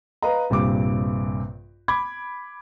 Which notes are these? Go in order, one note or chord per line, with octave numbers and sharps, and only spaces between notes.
B4 D#5 F5 A#5
A#1 G2 C3 D6
B5 D6 G#6